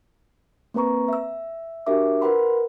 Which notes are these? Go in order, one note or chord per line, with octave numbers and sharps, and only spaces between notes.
A#3 C4 B4 A#5 C#6
E5 E6
D4 F#4 G4 A#4 E5 D6
F4 A#4 B4 F#5 B5 C6